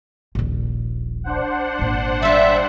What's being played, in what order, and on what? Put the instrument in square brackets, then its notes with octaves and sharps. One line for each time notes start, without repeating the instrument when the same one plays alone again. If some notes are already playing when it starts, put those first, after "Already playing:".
[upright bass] D#1 A#1
[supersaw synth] D4 C5 F#5
[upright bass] G#1 A#2
[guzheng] G3 F4 [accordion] E5